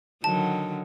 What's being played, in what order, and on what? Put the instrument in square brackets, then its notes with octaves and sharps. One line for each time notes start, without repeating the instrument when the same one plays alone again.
[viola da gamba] D3 D#3 F#3 [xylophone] A5